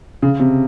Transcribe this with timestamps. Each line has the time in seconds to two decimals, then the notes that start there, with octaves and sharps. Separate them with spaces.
0.22 C#3
0.40 C3